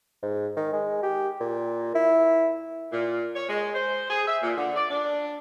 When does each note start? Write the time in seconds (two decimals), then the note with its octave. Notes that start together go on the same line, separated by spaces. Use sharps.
0.23 G#2
0.57 D#3
0.73 G#3
1.03 G4
1.40 A#2
1.95 E4
2.92 A#2
3.35 C#5
3.49 G#3
3.74 C5
4.10 G#4
4.27 E5
4.43 A#2
4.57 D3
4.76 D5
4.91 D4